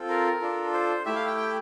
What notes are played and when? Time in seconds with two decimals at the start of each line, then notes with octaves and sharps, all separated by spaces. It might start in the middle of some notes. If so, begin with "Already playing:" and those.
Already playing: C4 F4 A4
0.09 A#4
0.40 D4 F4 A4
0.73 C5
1.06 A3 E4 G4 E5
1.16 F5
1.27 G5
1.37 G5